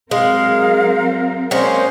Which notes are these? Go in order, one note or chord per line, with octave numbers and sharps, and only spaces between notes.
F#3 G#3 C4 A#4 F5
G#3 A#3 C#4 C5